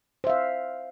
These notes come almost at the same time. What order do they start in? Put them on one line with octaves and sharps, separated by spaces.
C5 E5 F5